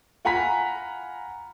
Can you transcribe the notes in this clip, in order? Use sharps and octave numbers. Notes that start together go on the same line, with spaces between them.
F4 F#5 G#5 A#5 B5 B6